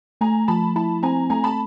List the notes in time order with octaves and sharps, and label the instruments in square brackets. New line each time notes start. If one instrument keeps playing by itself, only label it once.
[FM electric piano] A3 [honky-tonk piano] G#5 A#5
[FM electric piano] F3 [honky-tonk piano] A5 B5
[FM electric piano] E4 [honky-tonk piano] A5 B5
[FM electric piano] C4 [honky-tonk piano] G#5 A#5
[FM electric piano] A3 [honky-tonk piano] G#5 A#5
[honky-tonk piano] A5 B5